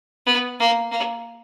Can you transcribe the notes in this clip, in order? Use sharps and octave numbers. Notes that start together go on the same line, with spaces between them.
B3
A#3
A#3